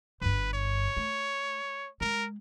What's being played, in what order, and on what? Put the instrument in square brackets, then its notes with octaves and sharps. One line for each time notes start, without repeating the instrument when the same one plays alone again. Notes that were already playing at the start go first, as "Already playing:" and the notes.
[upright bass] G1 G2 [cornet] B4
[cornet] C#5
[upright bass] A3
[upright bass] G#3 [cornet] A#4